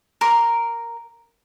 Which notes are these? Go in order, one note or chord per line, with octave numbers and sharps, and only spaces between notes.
A#4 C6 D6